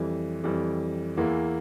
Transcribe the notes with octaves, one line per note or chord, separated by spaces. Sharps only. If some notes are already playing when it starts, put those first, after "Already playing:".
Already playing: F2 E3 G3
F2 E3 G3
E2 E3 A#3 E4